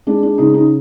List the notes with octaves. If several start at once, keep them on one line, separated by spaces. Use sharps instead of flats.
G#3 D4
D4
C#3 D#4
D#4